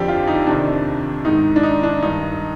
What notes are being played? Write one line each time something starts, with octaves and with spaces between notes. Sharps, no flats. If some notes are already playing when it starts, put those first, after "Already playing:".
Already playing: F2 D3 F3 G4 D5
F4
D#4
F2 C3 D#3 D4
G#2 D#3 D#4
D4
D#4
D4
G2 D#3 D#4